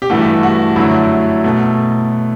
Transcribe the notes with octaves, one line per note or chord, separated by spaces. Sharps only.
G4
G2 E3 A3 F#4
F#4
F#2 D3 F#3 A3 E4
B2 A3